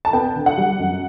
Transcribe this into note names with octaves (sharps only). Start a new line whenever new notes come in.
A5
B3 G5
D3
F#5
G3
F#2